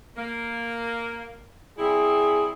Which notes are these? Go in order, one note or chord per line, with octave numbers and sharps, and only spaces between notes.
A#3
G3 C4 E4 G#4